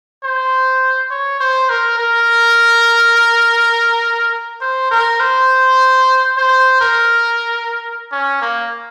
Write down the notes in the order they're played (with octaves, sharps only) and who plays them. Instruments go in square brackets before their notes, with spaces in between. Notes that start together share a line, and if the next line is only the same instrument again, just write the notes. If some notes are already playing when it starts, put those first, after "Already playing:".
[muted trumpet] C5
C#5
C5
A#4
A#4
C5
A#4
C5
C5
A#4
C#4
A#3